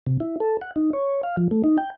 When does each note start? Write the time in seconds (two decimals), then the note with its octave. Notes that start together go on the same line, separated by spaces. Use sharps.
0.06 C3
0.20 E4
0.40 A4
0.61 F#5
0.76 D#4
0.93 C#5
1.23 F5
1.37 F3
1.51 A3
1.64 D#4
1.78 G5